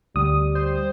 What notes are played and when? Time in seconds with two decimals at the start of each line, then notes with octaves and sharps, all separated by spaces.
0.16 D2 G3 D#6
0.55 C5